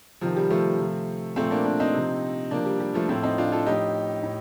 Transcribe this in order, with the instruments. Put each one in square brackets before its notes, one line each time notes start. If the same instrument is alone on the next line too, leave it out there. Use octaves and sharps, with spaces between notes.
[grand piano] C3 D#3 F3
G3
F3 A3
C3 F3
A#2 F3 A3 C4
A#3 D4
A#3 D4
C4 D#4
C3 F3
C3 F3 A#3 D4
G3
G3
F3 A3
A2 F3 A3 C4
C4 D#4
D4 F4
F4 A4
A2 F3 D#4 G4
A2